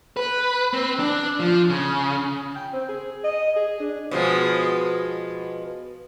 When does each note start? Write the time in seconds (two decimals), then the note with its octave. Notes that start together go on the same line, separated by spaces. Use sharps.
0.17 B4
0.73 C4
0.99 D4
1.40 F3
1.69 C#3
2.56 G5
2.73 C4
2.89 G#4
3.24 D#5
3.56 G#4
3.80 D4
4.11 B2 F3 G#3